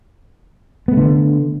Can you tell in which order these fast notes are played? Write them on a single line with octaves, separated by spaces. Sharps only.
B3 A3 D3